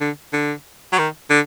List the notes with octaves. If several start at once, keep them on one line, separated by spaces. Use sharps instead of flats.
D3
D3
F#3
D#3
D3